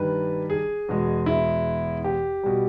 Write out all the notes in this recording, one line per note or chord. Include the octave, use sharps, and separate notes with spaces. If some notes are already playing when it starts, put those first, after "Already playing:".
Already playing: G2 D#3 G3 B4
G#4
E2 B2 G#3
E4
G4
B2 G3